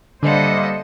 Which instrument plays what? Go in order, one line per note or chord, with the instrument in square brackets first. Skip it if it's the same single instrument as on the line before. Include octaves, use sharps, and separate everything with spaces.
[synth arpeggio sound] D3 [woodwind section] G3 A#3 [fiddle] A4 F#5 [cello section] C5 D#5 E5